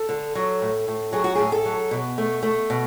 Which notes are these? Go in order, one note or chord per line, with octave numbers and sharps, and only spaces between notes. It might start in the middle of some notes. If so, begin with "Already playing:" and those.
Already playing: A4
D3
F#3
A2
A2
F#3 G#4
F#4
A2 G#4
A4
F#3
B2
A3
A3
B2